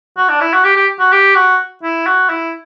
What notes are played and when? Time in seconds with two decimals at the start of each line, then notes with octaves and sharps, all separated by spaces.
0.17 F#4
0.29 D4
0.41 E4
0.53 F#4
0.65 G4
0.76 G4
0.99 F#4
1.12 G4
1.35 F#4
1.83 E4
2.07 F#4
2.29 E4